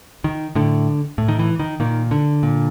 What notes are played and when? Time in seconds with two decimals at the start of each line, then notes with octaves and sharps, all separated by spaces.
0.24 D#3
0.55 A2 D3
1.18 A2
1.28 D#3
1.39 E3
1.59 D#3
1.80 A#2 D#3
2.11 D3
2.43 A#2